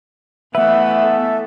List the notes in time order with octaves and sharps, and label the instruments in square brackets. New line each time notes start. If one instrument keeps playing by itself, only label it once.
[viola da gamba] E3 A3 [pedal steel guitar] B3 B4 [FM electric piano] E5 [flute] F#5
[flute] A4